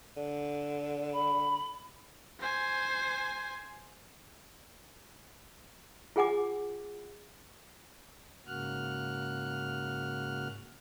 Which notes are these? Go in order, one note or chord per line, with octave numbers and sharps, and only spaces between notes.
D3
B5
C5 G#5
F4 G#4 F#5 G#5 D6
G#2 C#3 A#3 F#4 F6 F#6